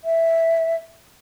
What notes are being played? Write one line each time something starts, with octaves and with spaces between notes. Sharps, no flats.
E5